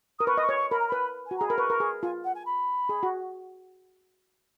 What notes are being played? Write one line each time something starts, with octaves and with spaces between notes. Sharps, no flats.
A#4 D#6
B4 C#6
D#5 C#6
C#5
C#6
A#4 B5
A#5
B4 B5
F#4 G#5
G#4 A#5
A#4 B5
B4 C#6
A#4
G#4
F4 G#5
F#5
G#5
B5
G#4
F#4